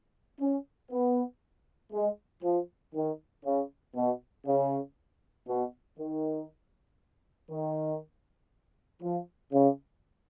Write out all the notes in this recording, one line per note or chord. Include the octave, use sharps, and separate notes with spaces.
C#4
B3
G#3
F3
D#3
C#3
B2
C#3
B2
D#3
D#3
F3
C#3